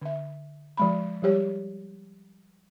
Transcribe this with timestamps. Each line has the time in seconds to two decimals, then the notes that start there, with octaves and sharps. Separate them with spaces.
0.02 D3 E5
0.77 F3 G#3 B5
1.22 F3 G3 G4 C#5